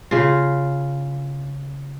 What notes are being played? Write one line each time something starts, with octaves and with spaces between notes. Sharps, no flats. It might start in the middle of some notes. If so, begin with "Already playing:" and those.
C#3 F4